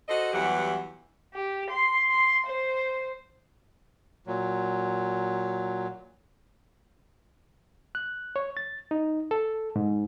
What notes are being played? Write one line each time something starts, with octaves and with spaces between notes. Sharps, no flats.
F#4 A4 C5 D#5
E2 E3 F#3 G3 G4 F#5
G4
C6
C6
C5
A#2 F#3
F#6
C#5
A6
D#4
A4
G#2